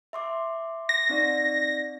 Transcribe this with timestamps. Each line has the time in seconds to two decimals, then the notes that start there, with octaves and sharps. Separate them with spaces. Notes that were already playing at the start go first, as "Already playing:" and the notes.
0.13 E5 C6 D6
0.89 A#6
1.09 C4 D#4 D5